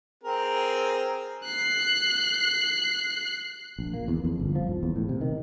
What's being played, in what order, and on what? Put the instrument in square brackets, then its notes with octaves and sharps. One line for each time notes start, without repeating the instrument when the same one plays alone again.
[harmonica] C4 G#4 A#4
[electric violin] F#6 C7
[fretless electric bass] A#1
A#3
E2
F2
G1
F3
D#1
E2
A2
C3
D#3